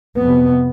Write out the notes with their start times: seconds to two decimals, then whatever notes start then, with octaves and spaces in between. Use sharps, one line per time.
0.19 F2 C3 B3